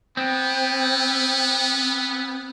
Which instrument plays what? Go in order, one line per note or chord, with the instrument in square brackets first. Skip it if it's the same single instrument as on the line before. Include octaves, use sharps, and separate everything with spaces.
[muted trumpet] B3 [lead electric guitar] C4